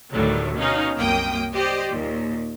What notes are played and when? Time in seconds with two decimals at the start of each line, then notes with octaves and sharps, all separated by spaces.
0.12 D2 A2 D#3 F#3 G3 A3
0.57 B2 C#4 D#4 F5
0.96 C2 F#2 A#3 G5 D#6
1.53 G4 C5 D5 D#5
1.90 D#2 A#2